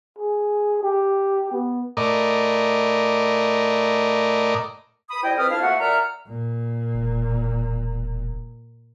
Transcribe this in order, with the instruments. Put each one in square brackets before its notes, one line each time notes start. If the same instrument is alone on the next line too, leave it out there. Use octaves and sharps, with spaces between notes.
[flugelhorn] G#4
G4
B3
[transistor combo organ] A2 A#4 D5 D#5
[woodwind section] B5 D#6
G3 E4 C5 D#5 G5
F2 C4 A4 B4 D#6 F6
F2 D4 E4 F4 F5 F6
A3 A#3 F#4 F#5
A#2 D5 E5 F#5 A#5 F6
[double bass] A#2
[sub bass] E1